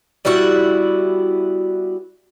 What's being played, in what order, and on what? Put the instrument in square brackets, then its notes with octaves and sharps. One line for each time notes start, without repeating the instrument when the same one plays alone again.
[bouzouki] G3 B3 E4 F#4